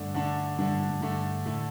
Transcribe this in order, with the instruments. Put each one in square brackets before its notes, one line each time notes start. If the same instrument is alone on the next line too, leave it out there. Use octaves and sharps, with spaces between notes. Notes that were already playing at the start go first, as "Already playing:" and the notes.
Already playing: [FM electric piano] G2 [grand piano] D3 A3 D4
[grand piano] D3 A3 D4
[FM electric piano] G2 [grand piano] D3 A3 D4
[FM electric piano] G2
G2
G2
[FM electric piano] G2 [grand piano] D3 A3 D4
[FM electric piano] A2 [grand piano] D3 A3 E4